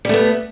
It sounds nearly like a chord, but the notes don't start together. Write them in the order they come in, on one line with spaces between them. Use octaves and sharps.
G3 A3 B3